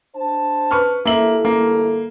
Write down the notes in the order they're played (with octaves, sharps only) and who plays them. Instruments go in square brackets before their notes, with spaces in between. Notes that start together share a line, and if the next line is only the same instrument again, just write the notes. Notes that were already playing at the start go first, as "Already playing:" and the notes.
[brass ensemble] D4 C5 A5
[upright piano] B4 C#6 F6
[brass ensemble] G1 E4 A4 [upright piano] A#3 E5 F#7
[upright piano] A#3